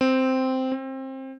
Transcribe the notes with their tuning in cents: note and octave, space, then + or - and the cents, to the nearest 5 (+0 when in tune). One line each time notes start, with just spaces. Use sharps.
C4 -5
C4 +25